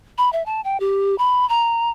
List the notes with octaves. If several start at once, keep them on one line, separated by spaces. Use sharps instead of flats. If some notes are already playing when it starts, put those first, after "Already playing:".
B5
E5
A5
G5
G4
B5
A#5